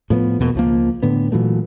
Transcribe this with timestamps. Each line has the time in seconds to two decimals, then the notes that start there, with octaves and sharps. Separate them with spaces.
0.10 A2 F3 B3
0.40 E2 B2 G#3 A#3
0.55 C#2 F3 A#3
1.03 A2 D3 B3
1.32 A#2 E3 F#3 A3